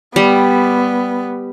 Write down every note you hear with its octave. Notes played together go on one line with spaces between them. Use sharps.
G3 B3